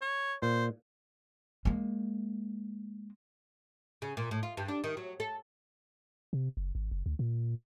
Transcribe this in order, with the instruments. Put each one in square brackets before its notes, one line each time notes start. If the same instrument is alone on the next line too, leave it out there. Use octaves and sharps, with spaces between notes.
[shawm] C#5
[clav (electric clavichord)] A#2 [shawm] C5
[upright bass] G#3 A#3
[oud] C#3
A#2
A2
F4
G2
D4
D#3
F#3
A4
[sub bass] C3
F#1
G#1
F#1
D2
A#2